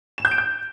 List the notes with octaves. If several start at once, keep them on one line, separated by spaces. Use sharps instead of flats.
E7
G6
D7
G6